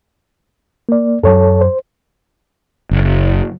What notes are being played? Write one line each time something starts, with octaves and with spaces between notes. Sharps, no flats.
A#3 D5
F#2 F#3 A4 C#5 A5
C5
F#1